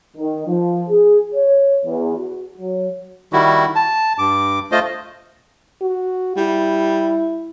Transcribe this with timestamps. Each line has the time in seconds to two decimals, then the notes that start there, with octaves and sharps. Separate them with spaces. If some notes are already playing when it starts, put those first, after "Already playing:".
0.17 D#3
0.47 F3
0.90 G#4
1.35 C#5
1.85 E2
2.17 F#4
2.58 F#3
3.33 D#3 G3 E4 F#4
3.75 A5
4.18 G2 D6
4.72 A3 F4 C5 D#5
5.81 F#4
6.37 G3 E4